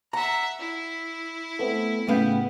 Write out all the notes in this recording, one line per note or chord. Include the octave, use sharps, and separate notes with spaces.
E5 F#5 A#5
E4
A3 B3 C4
A2 C#3 B3 F5 G5